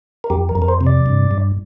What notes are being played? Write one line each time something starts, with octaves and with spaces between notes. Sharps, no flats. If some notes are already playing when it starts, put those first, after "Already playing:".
A#4
F2 G4
A#4
F2
A#4
C5
C3
D5
G2
G2